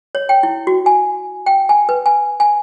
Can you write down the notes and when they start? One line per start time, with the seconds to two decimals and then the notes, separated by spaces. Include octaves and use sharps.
0.15 C#5
0.29 G5
0.43 E4
0.67 F#4
0.86 G#5
1.46 G5
1.69 G#5
1.89 B4
2.06 G#5
2.40 G#5